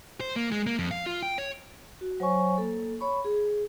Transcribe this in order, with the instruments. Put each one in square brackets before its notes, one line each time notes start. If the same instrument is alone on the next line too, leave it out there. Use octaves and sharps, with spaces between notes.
[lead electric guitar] C5
A#3
G#3
A#3
F2
F5
F4
G5
C#5
[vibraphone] F#4
F#3 C5 C#5 G#5 C#6
A#3 A4
C#5 B5 C#6
G#4